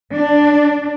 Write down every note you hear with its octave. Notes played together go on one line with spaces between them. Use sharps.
D4